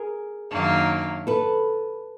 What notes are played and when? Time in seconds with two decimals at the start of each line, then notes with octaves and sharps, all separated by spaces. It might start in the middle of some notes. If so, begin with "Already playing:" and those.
Already playing: G#4 A#4
0.51 F#2 D#3 F#3 A#3 D4
1.27 A4 B4